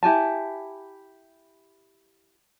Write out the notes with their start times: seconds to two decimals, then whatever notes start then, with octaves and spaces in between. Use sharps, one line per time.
0.03 E4 G4 G#5 A5